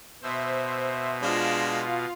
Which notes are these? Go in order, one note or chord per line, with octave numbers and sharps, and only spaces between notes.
B2 C5 E5
G#3 D4 F4 F5